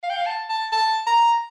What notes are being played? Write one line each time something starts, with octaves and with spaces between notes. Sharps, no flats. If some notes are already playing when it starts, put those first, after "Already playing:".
F5
G5
F5
A5
A5
A5
A#5